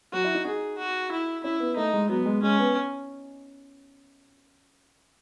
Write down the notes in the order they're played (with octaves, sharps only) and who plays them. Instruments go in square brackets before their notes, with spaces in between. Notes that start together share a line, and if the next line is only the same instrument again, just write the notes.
[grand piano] F#3 [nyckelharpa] F#4
[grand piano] E4
D#4
[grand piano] D#4 [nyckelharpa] G#4
[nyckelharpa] F#4
E4
[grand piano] C#4 [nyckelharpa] E4
[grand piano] B3
[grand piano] A3 [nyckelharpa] D#4
[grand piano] G#3
[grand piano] F#3 [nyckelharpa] B3
[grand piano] G#3
[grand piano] G#3 [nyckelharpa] C#4
[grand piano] B3